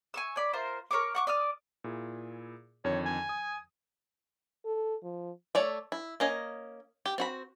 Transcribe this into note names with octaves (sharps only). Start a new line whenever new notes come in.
G#5 C#6 E6
C#5 D5 B5
F4 A#4 C5
A#4 C#5 C#6 D6
F#5 C#6 D6
D5 D6 D#6 F6
A#2 E4 G#4
F2 D3 D#3 C#5
G#5
D#6
A4
F3
A3 C#5 D5 E5
E4
A#3 C#4 D#5
G4
C4 F#4 B5